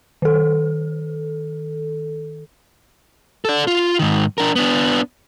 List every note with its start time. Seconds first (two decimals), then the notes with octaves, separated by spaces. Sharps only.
0.22 D#3 A4
3.45 A4 D5
3.67 F4
3.99 G#2 D#3
4.38 D4 A#4
4.56 B3 D4